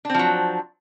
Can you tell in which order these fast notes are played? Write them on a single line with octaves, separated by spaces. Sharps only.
D4 C4 F3 F#3